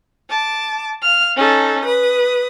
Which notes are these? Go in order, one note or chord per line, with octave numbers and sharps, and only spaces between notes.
A5 D6
F5 F6
C#4 D#4 A4
B4 D#6